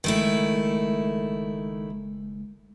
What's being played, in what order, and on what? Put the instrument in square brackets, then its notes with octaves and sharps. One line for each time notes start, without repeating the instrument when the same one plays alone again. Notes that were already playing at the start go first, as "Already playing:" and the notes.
[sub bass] F#1 [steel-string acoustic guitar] D#3 A3 E4 [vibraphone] G#3